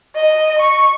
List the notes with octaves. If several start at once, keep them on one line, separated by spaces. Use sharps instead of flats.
D#5
C#6